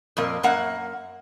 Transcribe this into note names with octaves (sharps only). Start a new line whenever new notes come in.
F2 A#2 A#3
F#2 A#3 F#5